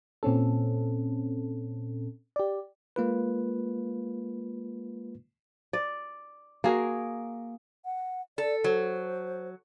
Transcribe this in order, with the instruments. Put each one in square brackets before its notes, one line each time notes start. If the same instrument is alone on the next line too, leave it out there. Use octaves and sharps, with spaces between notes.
[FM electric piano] A#2 C4 C#4 A4
G4 D5
[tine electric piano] G#3 A#3 F4 B4
[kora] D5
A#3 F#4 G#4 A#4
[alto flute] F#5
[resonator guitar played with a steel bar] A4 [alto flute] D5
[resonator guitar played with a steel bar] F#3 [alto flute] C5